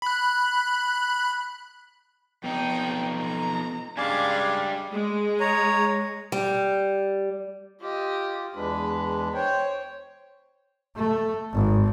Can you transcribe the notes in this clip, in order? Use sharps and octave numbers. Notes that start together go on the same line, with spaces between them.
B5 F#6
F2 B3 D#4 G5
A#5
C#3 G3 G#3 D4 F5 G#5 A5
G#3
C#5 A#5
G3
F4 G4 D#5
E2 G#3 D4 B4
C5 C#5 G5
A3
G#1